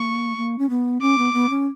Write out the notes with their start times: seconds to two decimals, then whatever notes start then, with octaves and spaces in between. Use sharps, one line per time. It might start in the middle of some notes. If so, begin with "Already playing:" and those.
Already playing: A#3 C#6
0.37 A#3
0.59 C#4
0.70 B3
1.01 C#4 D6
1.18 B3
1.33 B3
1.50 C#4